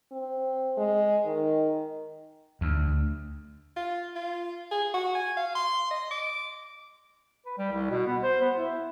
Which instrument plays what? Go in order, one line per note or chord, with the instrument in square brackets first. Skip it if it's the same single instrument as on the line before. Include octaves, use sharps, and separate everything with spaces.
[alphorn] C4
G#3
D#3
[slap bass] D2
[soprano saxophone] F4
F4
G#4
F#4
G#5
F5
C6
D#5
D6
[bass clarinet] B4
G3
C2
B2
B3
C5
B3
E4